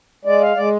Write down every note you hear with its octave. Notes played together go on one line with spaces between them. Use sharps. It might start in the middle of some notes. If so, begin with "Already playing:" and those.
G#3 D5
F5
G#3 D5